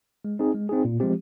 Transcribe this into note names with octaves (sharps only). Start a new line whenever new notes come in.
G#3
C4 D#4 G#4
G#3
C4 D#4 G#4
A#2
F3 G#3 C4 G4